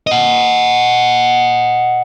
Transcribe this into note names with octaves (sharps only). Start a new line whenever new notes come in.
D#5 F#5